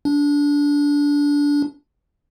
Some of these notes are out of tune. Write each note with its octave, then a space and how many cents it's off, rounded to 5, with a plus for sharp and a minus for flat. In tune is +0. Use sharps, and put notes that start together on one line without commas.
D4 -20